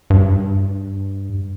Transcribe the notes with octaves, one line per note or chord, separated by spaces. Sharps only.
G2